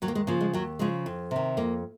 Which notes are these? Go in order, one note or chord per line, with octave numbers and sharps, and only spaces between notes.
D#2 F#3
A#3
G#3
C#3 F3 A#3
G#3
D#2 F#3
C#3 F3 G#3
F2
C3 D#3
F2 A#3